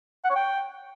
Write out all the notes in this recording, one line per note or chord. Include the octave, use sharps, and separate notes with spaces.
F#5
C#5
G5